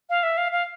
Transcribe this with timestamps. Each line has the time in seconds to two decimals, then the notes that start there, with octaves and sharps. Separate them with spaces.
0.10 F5
0.23 E5
0.37 F5
0.52 F5